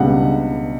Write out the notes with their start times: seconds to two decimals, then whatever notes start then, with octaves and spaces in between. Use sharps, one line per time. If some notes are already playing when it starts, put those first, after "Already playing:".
Already playing: C#2 B2 G3 D4 F#5